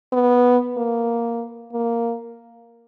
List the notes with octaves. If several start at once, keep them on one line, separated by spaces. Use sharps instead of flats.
B3
A#3
A#3